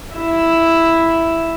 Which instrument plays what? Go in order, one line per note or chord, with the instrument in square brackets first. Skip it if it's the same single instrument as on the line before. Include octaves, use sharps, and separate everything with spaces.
[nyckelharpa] E4